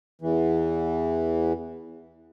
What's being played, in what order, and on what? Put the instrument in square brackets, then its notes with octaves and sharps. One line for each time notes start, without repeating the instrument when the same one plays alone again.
[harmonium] E2 E3